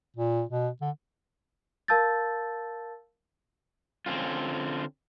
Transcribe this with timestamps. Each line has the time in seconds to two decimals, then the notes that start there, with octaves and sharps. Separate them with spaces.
0.16 A#2
0.49 B2
0.81 D3
1.88 A#4 F5 A5 E6 G6 A6
4.06 D3 C4 C#4 F4